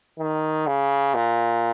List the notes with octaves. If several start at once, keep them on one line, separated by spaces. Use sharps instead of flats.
D#3
C#3
A#2